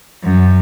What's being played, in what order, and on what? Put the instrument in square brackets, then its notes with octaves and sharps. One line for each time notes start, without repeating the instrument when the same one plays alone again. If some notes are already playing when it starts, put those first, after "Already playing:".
[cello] F#2